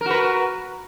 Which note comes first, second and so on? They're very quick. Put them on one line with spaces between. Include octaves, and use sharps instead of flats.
A#4 F#4 B4